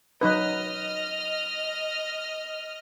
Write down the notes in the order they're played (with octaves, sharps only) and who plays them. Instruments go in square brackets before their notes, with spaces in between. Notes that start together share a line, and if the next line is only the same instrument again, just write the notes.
[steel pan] F#3 D#4 B4 [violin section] D#5 F6